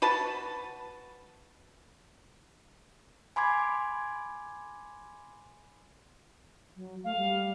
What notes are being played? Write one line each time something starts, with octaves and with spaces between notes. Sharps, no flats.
F#4 B4 A5
G#5 B5 C6 D6 G#6
F#3
A3 F5
G3